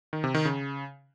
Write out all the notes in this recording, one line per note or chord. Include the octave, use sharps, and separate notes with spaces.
D#3
C3
D#3
C#3